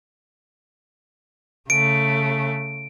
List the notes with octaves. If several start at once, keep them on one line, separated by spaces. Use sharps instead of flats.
C#3 A3 D7